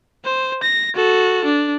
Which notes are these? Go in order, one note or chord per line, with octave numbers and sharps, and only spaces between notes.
C5
A#6
F#4 A4
D4